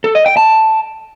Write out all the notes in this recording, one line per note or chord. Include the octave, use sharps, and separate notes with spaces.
A4
D#5
G5
A5